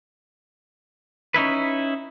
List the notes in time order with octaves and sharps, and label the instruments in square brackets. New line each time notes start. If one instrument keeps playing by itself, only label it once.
[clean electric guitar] C#4 D#4 E4 B4